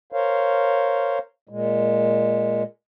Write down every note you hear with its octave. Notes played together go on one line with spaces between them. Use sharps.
A#4 C5 C#5 F5
A#2 G#3